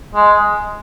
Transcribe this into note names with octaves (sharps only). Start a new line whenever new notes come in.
G#3